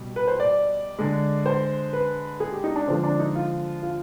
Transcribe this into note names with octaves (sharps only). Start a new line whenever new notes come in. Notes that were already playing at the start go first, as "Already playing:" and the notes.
Already playing: B2 G3
B4
C5
D5
D3 G#3
C5
B4
G#4
G4
D#4
D4
D3 F3 G#3 C4
D4
D#4
F4
F4